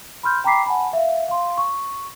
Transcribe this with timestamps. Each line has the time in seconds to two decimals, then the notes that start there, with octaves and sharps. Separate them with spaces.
0.23 B5 C6 F6 G6
0.44 G5 A#5 B5 D6 B6 C7
0.66 F#5 G#5 A5 B5
0.93 E5 F5
1.28 F5 C6
1.58 C#6